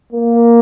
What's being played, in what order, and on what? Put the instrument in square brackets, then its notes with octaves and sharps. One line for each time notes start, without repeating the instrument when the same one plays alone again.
[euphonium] A#3